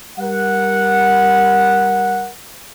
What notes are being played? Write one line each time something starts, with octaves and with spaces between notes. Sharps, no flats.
G3 A#4 F#5